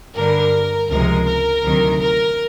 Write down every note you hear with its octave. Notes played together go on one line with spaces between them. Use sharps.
G2 D3 G3 A#4
C#2 C3 F3 G#3 A#4
A#4
D2 C3 D#3 F#3
A#4